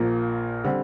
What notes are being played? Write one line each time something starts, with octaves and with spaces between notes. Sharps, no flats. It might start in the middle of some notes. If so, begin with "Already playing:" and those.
Already playing: A#1 A#2 F3 A#3
D3 G3 C4